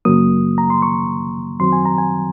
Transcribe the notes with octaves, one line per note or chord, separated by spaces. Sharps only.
F#2 C#3 F#3 A#3 D#6
A#5
C6
C#6
F#2 D#3 F#3 C4 C6
G#5
A#5
G#5